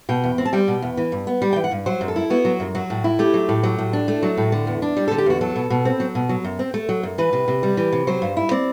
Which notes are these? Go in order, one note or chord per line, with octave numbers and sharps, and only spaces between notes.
B2 G5
E2
C4
A5
G3 G5
B2
E2
E3
G2
B3
G3 G5
G5
E3
F#5
G2
F#3 C5
F#2
A4
E4
B3 F#4
F#3
F#2
F#3 F#4
A2
E4
A3 G4
F#3
A2
F#3
A2
D4
A3
F#3
A2
D3
E2
D4
G3 D5
A4
D3
G4
E2 F#4
F#3 A4
B2
B2
C4
F#3
B2
F#3
F#2
C4
A3
F#3
F#2
E3 B4
C3
C3
G3
E3
C3
F#3 C5
G2
E4
C4 D5